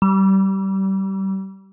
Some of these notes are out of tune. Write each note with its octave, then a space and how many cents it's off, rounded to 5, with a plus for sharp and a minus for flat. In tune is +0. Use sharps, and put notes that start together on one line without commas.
G3 -25